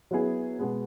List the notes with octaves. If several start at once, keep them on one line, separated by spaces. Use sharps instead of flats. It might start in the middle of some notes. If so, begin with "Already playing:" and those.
F#3 B3 E4 G#4
B2 G#3 B3